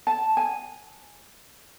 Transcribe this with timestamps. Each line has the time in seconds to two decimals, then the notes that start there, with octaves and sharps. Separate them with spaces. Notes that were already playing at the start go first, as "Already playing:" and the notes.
0.07 A5
0.37 G#5